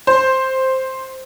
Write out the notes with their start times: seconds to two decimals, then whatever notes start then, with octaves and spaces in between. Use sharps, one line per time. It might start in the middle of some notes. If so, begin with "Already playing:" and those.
0.07 C5